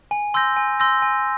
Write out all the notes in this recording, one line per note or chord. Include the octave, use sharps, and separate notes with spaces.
G#5
C6 E6 G6 A#6
G#5
C6 E6 G6 A#6
G#5